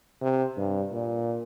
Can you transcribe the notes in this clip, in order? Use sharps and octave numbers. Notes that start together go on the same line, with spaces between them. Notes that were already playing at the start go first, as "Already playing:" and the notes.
C3
G2
A#2